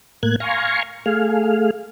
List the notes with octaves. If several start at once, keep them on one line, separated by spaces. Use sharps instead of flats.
A2 A#3 F#6 G#6
F5 G#5 A#5 C6 C#6
A3 G#4 F5